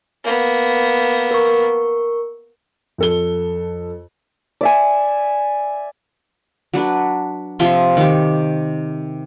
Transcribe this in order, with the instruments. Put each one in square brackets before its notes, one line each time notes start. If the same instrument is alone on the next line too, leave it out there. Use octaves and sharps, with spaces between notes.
[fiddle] A#3 B3
[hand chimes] A#4 C#6
[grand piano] F2 A4 G7
[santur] D5 E5 G#5
[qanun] F#3 D4 B4
C3 F3 E5 C6
D#3 G4